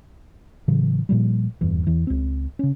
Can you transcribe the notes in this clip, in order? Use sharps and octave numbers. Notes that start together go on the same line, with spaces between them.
A2 C#3 E3 F#3
A#2 F3 G3
D#1 E2 G2 E3
E2 E3
C#2 C4
C#3 C#4